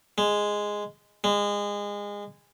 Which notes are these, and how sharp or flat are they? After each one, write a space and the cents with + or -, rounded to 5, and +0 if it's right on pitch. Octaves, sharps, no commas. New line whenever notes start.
G#3 -5
G#3 -25